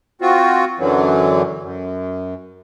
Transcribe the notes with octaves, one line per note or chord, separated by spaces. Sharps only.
C4 F4 F#4
F#2 D3 E3 F#3
F#2